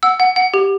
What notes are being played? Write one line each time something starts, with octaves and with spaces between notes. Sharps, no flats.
F#5 E6
F#5
F#5
G4